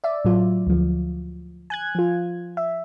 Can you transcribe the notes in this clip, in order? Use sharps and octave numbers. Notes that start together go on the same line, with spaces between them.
D5 E5
A2 F#3 F4
D2 F3
G#5 F#6 G#6
F3 F4
E5